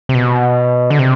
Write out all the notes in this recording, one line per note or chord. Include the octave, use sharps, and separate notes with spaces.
C3
B2
D3
C3